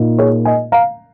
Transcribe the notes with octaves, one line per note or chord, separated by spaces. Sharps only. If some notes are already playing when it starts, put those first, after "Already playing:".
Already playing: A#2 A#3 D#4
G#4 C#5
D#5 G#5
F5 A#5